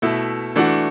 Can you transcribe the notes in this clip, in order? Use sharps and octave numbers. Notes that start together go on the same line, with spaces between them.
B2 A3 E4
E3 A3 D4 F#4